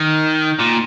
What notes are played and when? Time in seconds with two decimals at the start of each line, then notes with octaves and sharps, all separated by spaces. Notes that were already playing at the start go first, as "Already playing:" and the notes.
Already playing: D#3
0.59 A#2